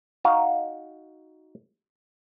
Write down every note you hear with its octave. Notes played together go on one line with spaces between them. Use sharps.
D#4 F#4 F5